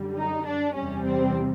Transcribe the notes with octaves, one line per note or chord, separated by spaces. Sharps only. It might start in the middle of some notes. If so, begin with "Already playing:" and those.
Already playing: F#2 D3 G3
D#4
D4
E2 C3 E3 G3 C#4
C4